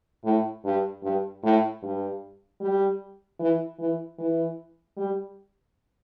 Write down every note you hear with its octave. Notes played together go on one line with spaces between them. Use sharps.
A2
G2
G2
A2
G2
G3
E3
E3
E3
G3